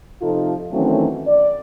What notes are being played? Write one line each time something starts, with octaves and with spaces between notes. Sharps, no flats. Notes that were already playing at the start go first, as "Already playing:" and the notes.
C3 F3 D#4 F4 A4
D#3 E3 F#3 A3 C4 C#4
D5